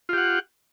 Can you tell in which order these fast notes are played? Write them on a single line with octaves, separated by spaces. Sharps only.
F4 G4 F#5